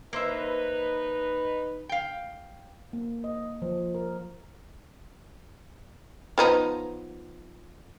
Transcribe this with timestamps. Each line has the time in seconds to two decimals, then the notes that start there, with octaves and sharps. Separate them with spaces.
0.13 A#3 D#4 B4 C5 E5
1.89 F5 G5
2.93 A#3
3.24 D#5
3.62 F3
3.95 A#4
6.38 F3 B3 D#4